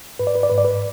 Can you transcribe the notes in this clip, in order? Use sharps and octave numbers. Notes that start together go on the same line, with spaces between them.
G#2 B4
D5
B4
D5
G#2 B4
D5
B4